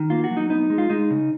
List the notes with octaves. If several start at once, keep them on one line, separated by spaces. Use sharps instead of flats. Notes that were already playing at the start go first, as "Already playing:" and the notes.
Already playing: D#3
A#3 F4
F#4
F#3
D#4
B3 D#4
G#3
F4
G#3 D#4
C#3